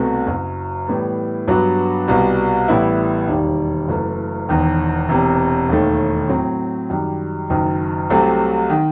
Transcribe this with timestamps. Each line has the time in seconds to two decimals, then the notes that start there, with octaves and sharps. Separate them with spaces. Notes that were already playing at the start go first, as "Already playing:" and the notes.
Already playing: C2 B2 A3 C4
0.27 F#1 F#2 F#3
0.87 A2 E3 G3 B3
1.48 G2 F#3 B3 F#4
2.08 C2 B2 G3
2.68 A1 A2 G3 B3 E4
3.28 E1 D#2 D#3 G3
3.88 F#1 F#2 E3 A3
4.49 E1 E2 D#3
5.09 E1 E2 C3
5.69 E1 D#2 D#3 A3
6.29 A2 F#3 C4
6.90 F#2 D#3 G3
7.50 F#1 F#2 D#3
8.10 C2 C3 F#3 A3 C4
8.70 D#3